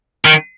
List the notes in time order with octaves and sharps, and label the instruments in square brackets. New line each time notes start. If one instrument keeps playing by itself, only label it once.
[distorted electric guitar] D#3